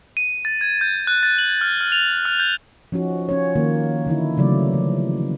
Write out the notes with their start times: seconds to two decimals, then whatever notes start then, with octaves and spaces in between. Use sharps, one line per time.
0.17 D#7
0.45 A6
0.61 G#6
0.81 G6
1.07 F#6
1.23 A6
1.38 F#7
1.61 F6
1.81 F6
1.92 F7
2.25 F6
2.40 G6
2.92 F3 C#4 D#4 F#4
3.29 C#4 F4 C#5
3.56 D#3 A#3
4.06 D3 E3 D#4 E4
4.37 C#3 E3 F#3 A3 D5
4.74 F3